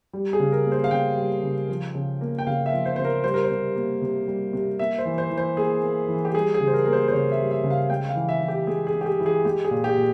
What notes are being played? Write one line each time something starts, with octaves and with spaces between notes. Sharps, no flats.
G3
G#4
C#3
A#4
A#3
C5
F5
C#3 G5
G3
C#3
F3
C#3
A#3
G5
C#3 F5
E5
F3
C5
C#3 C5
A#4
G3 C5
A#4
C5
C3
A#3
C3
G3
C3
A#3 E5
C5
E3
C5
E3
C5
A#3 G#4
A#3
E3
G4
G3 G#4
G#4
C#3
C5
A#4
A#3 A#4
C5
C5
C#3 C#5
E5
G3
E5
C#3
F5
G#3 G5
F5
E3
E5
E3
G4
G#3 G#4
G#4
G#3
G4
G#4
E3
G#4
G#3 G4
G#4
A#2
G4
A#2